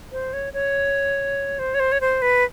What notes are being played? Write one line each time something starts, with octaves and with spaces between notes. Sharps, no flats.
C5
C#5
C#5
C5
C#5
C5
C#5
C5
B4